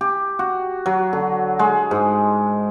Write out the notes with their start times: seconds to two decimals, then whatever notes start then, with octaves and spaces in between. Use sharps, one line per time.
0.01 G4
0.39 F#4
0.86 F#3
1.13 D3
1.59 G#3
1.91 G#2